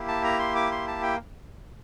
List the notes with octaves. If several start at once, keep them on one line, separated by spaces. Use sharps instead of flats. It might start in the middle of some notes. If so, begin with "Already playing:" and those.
Already playing: A#3 E4 G4
A5
A#5
C6
D6
C6
A5
G5